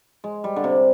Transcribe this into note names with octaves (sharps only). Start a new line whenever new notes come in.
G#3
G3
D3
C3